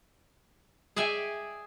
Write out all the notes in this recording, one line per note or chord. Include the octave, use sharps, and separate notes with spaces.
G#4 D5 E5 G5 G#5